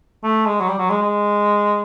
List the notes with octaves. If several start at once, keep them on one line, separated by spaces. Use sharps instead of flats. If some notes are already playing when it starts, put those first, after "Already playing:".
A3
G#3
F#3
G3
F#3
G#3
G#3